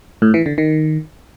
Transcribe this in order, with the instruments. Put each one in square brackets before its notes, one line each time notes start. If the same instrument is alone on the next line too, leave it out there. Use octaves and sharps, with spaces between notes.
[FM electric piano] A2
E3
D3
D#3